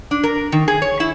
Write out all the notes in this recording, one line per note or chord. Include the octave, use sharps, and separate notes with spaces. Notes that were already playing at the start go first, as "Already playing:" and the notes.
D4
A#4
D#3
G#4
C#5
E4